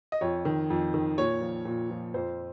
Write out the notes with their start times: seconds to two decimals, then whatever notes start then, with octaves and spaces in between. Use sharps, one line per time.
0.12 D#5
0.21 F2 C#5
0.45 D#3
0.70 F2
0.94 D#3
1.18 A#2 C#5
1.42 F3
1.65 A#2
1.90 F3
2.14 F2 C5